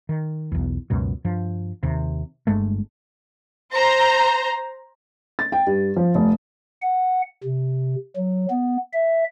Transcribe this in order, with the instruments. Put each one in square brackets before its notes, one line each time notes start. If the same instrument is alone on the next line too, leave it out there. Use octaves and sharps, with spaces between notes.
[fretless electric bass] D#3
B1 E2
C#2 F#2 B2
G2 F3
D#2 C3
G1 G2 G#3 A3
[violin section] C5 A#5
[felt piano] A6
G5
G2
F3
F1
[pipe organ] F#5
C3
F#3
B3
E5